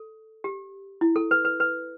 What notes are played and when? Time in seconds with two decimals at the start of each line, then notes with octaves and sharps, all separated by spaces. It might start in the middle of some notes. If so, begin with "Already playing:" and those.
Already playing: A4
0.44 G4
1.01 E4
1.16 A4
1.31 B4
1.45 B4
1.60 B4